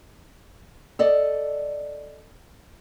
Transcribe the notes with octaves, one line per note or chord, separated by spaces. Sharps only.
A4 D5 D#5